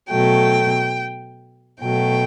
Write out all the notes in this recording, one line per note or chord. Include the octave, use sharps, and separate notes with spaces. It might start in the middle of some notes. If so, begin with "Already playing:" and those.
B2 F#3 A3 G5
B2 F#3 A3 G5